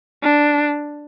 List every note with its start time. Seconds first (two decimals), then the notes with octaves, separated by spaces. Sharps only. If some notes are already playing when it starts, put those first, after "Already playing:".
0.23 D4